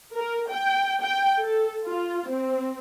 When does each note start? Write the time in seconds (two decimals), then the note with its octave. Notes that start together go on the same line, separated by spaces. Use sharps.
0.15 A#4
0.49 G5
1.01 G5
1.41 A4
1.85 F4
2.29 C4